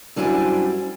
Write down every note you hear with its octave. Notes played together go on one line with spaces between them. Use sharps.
F#2 G3 D4 E4 C5 G#5